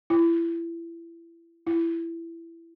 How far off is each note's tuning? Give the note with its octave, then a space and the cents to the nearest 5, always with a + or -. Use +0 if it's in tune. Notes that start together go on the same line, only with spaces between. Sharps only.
E4 +30
E4 +20